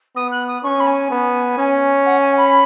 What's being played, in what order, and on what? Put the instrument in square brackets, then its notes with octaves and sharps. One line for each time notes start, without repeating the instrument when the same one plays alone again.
[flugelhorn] B3 [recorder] D#6
[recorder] F#6
D#6
[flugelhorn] C#4 [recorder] C#6
[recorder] B5
G#5
[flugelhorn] B3
C#4
[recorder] F#5
G#5
B5